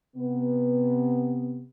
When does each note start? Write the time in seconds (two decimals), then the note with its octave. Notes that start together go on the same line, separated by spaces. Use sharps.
0.17 C3 B3